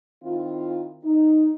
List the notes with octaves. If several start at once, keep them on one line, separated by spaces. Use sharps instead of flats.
D#3 C4 E4 F4
D#4